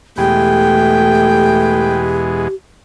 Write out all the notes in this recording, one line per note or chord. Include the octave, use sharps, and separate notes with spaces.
E2 B2 G#3 A3 G4 G5